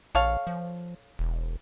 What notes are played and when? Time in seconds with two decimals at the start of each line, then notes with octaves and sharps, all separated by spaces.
0.15 A#1 A4 C#5 F5
0.47 F3
1.19 E1